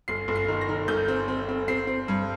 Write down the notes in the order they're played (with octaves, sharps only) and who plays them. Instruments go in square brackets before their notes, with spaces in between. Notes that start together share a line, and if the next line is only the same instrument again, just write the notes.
[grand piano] G1 C7
G1
C7
D#3
A#6
D#3
G1 G6
C4
C4
C4
C4 C7
C4
G2